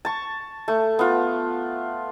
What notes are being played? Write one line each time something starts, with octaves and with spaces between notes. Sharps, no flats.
A5 C#6
A3
B3 F4